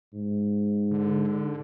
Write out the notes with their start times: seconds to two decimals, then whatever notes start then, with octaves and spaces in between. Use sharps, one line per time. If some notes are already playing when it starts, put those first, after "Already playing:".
0.13 G#2
0.91 D3